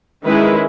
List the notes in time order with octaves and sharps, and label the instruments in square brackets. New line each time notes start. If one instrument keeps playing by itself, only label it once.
[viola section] D#3 G#3 C#4 E4 B4